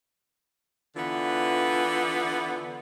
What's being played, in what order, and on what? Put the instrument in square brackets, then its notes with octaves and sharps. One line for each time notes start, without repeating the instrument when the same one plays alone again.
[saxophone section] D3 E3 B3 F4